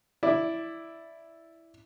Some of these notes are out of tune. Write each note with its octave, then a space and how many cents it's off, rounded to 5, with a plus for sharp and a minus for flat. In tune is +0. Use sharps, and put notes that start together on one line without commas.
E4 +0 D5 +0